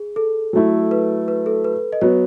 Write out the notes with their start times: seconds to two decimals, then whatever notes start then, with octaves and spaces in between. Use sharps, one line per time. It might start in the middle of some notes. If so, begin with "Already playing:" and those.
Already playing: G#4
0.16 A4
0.53 F#3 A3 E4
0.91 B4
1.28 B4
1.46 A4
1.65 B4
1.93 D#5
2.01 F#3 B3 C#5